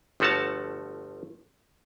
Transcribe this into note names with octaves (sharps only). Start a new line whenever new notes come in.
G1 F3 A3 F#4 C#5 A5